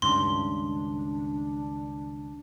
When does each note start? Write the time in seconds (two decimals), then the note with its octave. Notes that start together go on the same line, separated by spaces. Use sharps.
0.02 C#2 G2 D#3 C#4 D4 C6